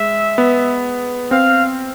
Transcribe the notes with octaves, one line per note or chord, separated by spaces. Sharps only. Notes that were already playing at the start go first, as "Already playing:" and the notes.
Already playing: G#3 E5
B3
C4 F5